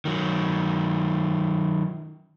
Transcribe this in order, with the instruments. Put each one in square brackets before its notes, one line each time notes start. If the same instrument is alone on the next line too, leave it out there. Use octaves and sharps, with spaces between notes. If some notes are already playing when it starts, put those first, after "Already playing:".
[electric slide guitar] D#3 F#3